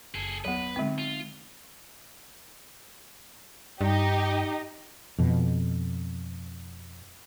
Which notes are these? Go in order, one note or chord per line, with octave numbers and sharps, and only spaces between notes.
F#1 G#4 A4
D#2 F#3 B3 B4
D3 G#3 C4 D#4
F4
G2 D#4 G4 D#5
F2 B2